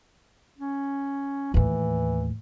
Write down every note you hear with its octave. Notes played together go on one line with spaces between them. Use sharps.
C#4
D#2 A2 E3